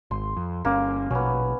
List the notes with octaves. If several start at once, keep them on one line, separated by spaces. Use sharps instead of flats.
G#1 C6
F2
G1 A#3 C#4
A#1 B2 B3 C#4